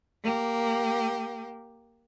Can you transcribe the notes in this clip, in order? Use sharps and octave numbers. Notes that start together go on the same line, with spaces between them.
A#3 G4